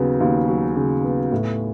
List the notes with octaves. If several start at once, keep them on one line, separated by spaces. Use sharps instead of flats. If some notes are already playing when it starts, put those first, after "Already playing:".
Already playing: D#2 C#3 F#3 B3
D#2
F#3
C#3
B3
A2